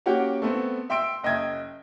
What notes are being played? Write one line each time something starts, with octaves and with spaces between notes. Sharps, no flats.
A#3 C#4 F#4 G4 F#5 G5
A3 B3 C4
E5 G5 C6 E6 D7
F#1 D#5 E5 G5 G#6